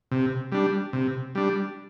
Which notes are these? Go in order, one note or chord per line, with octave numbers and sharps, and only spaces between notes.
C3
G3 D4
C3
G3 D4